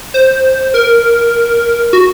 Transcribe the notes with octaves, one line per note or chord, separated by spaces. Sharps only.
C5
A#4
F#4